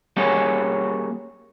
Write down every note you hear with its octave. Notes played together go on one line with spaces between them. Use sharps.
G3 A#3 C#4 F#4 G#4 C#5